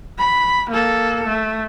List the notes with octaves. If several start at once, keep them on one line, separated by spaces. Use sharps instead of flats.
B5
A#3 A4
A3